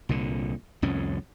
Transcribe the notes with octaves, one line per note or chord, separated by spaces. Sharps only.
C2 A#2 D3
C2 F2 A2 C#4